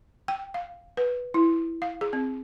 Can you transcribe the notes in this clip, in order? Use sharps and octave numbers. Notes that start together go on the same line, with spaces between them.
G5
F5
B4
E4
F5
G#4
C4